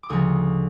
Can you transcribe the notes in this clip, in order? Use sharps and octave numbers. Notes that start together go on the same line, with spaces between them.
D6
D2 C#3 F3 C#6 D#6